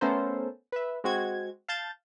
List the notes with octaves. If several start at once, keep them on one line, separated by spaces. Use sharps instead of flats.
A3 B3 C#4 A4 A#4 C5
B4 E5
G#3 C4 F#4 G#6
F5 A5 G6 A6